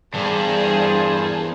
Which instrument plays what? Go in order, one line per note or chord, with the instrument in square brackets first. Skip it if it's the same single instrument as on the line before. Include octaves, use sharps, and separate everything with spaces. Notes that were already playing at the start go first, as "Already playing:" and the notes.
[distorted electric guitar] E2 [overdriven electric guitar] G2 [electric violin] G#4 [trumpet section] A#4 C5 A5